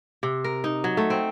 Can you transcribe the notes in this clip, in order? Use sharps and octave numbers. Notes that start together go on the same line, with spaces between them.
C3
A#4
D#4
F#3
A3
C4